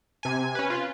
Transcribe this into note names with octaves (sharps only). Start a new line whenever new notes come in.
C3 G#5
C#4 B4
F4 B4